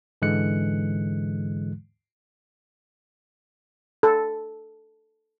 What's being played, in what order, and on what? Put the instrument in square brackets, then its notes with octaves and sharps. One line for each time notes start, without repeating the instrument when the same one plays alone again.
[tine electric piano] G#2 D3 E3 G#3 F#6 C#7
[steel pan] A4